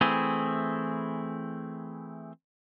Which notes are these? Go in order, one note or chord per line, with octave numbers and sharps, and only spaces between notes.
E3 A3 C4 E4 G#4